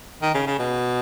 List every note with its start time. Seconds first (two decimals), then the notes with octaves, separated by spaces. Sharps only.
0.23 D#3
0.35 C#3
0.47 C#3
0.59 B2